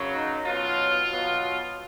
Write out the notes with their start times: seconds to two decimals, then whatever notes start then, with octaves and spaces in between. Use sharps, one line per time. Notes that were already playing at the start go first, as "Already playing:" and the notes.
Already playing: F#2 C#3 F#3
0.14 D#4
0.46 B2 F#3 F4
1.10 B2 F#3